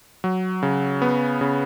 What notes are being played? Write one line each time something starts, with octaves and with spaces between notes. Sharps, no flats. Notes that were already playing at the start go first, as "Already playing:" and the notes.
F#3
C#3
B3
C#3